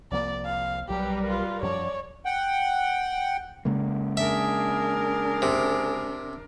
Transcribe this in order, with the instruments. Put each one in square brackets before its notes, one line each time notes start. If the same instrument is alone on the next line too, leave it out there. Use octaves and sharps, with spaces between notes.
[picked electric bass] C2 F3 A#3 [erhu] D5
[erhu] F5
[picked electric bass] B1 F#3 [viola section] G3 A#4 B4 [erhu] G4
[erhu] F4
[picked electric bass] F#2 F3 [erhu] C#5 [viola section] D5
[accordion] F#5 G5
[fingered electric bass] C#3 G#3 A#3
[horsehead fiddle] D4 A#4 [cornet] G#4 [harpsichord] E5
[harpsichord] C3